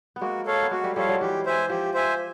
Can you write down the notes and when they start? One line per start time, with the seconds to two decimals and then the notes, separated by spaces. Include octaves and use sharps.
0.16 B3
0.21 G#3 A#3 F#4
0.46 A4 C#5 F5
0.62 B3
0.71 G#3 A#3 F#4
0.84 G3 A3
0.95 F3 G3 A4 C#5 F5
1.08 F#3 G#3
1.21 E3 G4
1.46 C5 E5 G#5
1.69 F3 G4
1.94 C5 E5 G#5